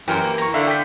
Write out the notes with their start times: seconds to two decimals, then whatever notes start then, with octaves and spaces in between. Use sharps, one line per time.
0.08 F#2 E3 G4 A#4 C5
0.22 A#3
0.38 A#5 C#6
0.54 D3 E5 F5
0.67 G5 D6 G6 B6